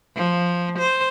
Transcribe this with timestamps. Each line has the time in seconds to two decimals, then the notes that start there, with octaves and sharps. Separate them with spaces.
0.16 F3
0.79 C5